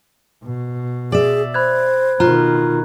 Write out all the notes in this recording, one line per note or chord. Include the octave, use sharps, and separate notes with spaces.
B2
G#4 D5 E5
C5 B5 F#6 G#6
B2 D#3 F4 A#5 F#6